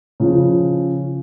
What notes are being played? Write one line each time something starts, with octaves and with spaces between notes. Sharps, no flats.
C#3 F3